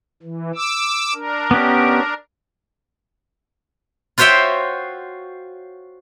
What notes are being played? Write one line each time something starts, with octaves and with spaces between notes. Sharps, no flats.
E3
D6 E6
D4 A#4
B3 C#4 G4
F4 F#4 C5 C#5 E5 G5